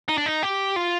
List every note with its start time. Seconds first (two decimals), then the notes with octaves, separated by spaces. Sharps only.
0.09 D#4
0.18 D4
0.26 D#4
0.43 G4
0.76 F4